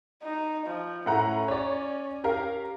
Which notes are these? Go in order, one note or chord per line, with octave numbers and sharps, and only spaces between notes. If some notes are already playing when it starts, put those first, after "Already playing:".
D#4
F3
A2 C#4 F#5 A#5
C#5 D5
G4 A#4 F5